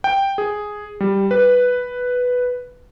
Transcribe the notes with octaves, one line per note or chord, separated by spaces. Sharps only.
G5
G#4
G3
B4